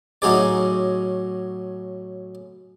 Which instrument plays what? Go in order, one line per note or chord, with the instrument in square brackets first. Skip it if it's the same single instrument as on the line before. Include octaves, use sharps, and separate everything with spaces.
[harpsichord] A2 F#3 C#4 D#4 G#4 D5